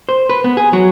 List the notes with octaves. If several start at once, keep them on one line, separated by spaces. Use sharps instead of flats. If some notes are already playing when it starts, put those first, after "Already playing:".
C5
B4
B3
G#4
F#3